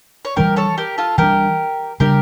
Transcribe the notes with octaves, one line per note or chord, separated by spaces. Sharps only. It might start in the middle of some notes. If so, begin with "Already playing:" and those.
C#5
E3 G3 D4 G4 A#4
A4 C#5
G4 A#4
F4 A4
E3 G3 D4 G4 A#4
C#3 G3 D4 G4 A#4